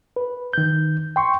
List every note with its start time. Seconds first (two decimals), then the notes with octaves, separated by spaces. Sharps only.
0.16 B4
0.53 D#3 G6
1.16 G5 C6 C#6